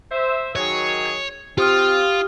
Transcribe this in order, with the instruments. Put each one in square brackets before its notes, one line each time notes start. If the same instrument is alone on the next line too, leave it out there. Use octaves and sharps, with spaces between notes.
[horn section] C5 E5
[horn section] D#3 F#3 G#4 [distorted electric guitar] C#5
[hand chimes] G#6
[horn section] C4 [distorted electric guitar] F4 [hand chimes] G4 D#6 F6